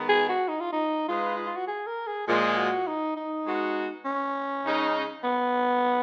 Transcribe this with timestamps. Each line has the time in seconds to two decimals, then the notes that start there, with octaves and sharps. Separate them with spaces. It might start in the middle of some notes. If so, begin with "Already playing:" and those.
Already playing: D#3 G#3 B3
0.09 G#4
0.29 F#4
0.48 D#4
0.61 F4
0.73 D#4
1.08 G#3 D#4 F4 G#4 B4
1.46 F4
1.57 F#4
1.68 G#4
1.87 A#4
2.07 G#4
2.27 A#2 F3 G#3 G#4
2.57 F#4
2.87 D#4
3.16 D#4
3.46 G#3 B3 F#4
4.05 C#4
4.65 C#3 G#3 D#4
5.24 B3